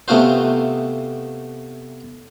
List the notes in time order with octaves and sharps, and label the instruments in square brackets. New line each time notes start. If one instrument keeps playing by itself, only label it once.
[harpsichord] C3 A3 B3 F4 F#4 C5